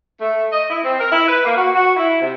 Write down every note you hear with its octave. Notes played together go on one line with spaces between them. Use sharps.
A3
D#5
E4
C4
A#4
E4
B4
A#3
F#4
F#4
E4
C3